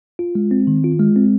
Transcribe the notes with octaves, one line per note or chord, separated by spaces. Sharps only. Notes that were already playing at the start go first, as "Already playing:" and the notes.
F4
G#3
C4
D#3
F4
G#3
C4